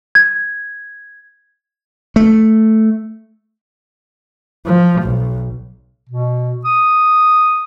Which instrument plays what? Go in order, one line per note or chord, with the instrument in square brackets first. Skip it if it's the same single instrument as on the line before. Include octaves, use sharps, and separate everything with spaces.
[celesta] G#6
[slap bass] A3
[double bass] F3
B1
[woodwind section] B2
D#6